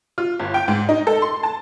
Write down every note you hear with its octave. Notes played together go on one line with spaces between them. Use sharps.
F4
G1
G5
G#2
D#4
A4
C6
A5